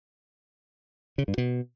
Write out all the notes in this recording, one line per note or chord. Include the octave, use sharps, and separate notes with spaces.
C#3
G2
B2